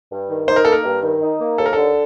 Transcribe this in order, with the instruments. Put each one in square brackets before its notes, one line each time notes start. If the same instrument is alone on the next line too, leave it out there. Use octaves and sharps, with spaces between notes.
[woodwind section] G2
D#3
[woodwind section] D#4 [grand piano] C5
[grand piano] A#4
[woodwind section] A#3 [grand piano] A4
[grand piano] A#4
[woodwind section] G2
D#3
D#4
A#3
[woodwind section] D#2 [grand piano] A4
[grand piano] A#4
[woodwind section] D3 [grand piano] A4